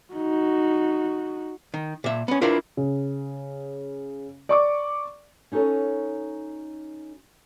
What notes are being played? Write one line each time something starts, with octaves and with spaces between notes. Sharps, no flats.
D#4 F#4
D#3
A#2 E5
B3 C#4
D4 E4 F4 A#4 B4
C#3
D5 C#6 D6
C#4 D#4 F#4 A4 C#5